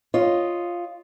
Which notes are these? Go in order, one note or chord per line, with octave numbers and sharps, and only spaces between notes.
F4 C#5 D#5